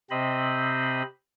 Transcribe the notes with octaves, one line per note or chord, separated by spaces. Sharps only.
C3 C4 C5 D#5 B5